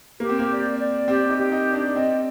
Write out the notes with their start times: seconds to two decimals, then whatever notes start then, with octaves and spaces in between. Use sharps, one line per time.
0.20 A#3 G4
0.29 C4
0.39 A#3
0.50 D5
0.78 D5
1.08 C4 G4
1.29 D#4
1.37 G4
1.52 D#4
1.67 D5
1.74 D4
1.95 C4 D#5